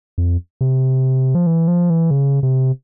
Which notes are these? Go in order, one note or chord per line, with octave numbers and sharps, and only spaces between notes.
F2
C3
F3
E3
F3
E3
C#3
C3